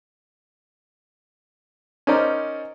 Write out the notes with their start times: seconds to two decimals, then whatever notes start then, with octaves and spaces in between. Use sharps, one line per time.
2.07 C#4 D#4 A#4 C5 D5